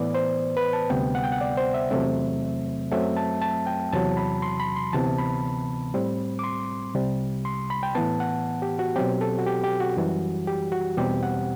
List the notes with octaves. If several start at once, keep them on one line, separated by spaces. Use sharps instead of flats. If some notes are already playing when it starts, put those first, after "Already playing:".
Already playing: A2 E3 B3 D5
C5
B4
A5
D2 C3 G3 B3 G5
F#5
G5
F#5
D5
C5
E5
E2 C3 F#3 A3 C4
F#2 F#3 A3 C4 E5
A5
A5
G5
E2 C3 F#3 A5
B5
C6
B5
C6
D2 C3 E3 B3 A5
B5
A2 G3 C4
D6
C6
C2 C3 G3
C6
B5
G5
A2 E3 B3 A5
F#5
G4
F#4
B2 F#3 C4 G4
A4
F#4
G4
G4
F#4
F#2 E3 G3
G4
F#4
E2 B2 G3 C4 G4
F#5